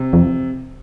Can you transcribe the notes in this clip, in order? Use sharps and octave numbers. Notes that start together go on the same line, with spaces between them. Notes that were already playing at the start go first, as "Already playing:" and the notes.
Already playing: C3
F2